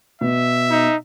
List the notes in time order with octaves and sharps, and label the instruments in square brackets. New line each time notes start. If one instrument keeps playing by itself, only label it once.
[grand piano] B2 [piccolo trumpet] E5
[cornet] D#4